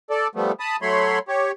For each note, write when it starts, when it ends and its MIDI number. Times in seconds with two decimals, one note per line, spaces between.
0.10 0.28 69
0.10 0.28 74
0.35 0.52 53
0.35 0.52 55
0.35 0.52 57
0.35 0.52 59
0.60 0.76 81
0.60 0.76 83
0.60 0.76 87
0.82 1.19 54
0.82 1.19 57
0.82 1.19 73
0.82 1.19 83
0.82 1.19 84
1.28 1.52 67
1.28 1.52 73